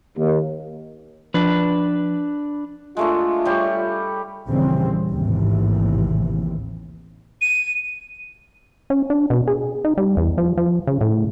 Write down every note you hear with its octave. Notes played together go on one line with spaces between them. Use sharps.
D#2
F3 D4 B4
G#3 A3 D4 F4
G3 G4 C#5
A#1 D#2 C#3 E3 G3 C4
A1 D#2 G#2 C3 E3
D#7
C#4
D4
B2
G#4
D#4
G3
E2
F3
F3
C#3
A2